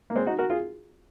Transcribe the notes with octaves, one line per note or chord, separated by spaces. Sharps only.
A#3
G#3 C4
D#4 F#4
F#4 A#4
F4 G#4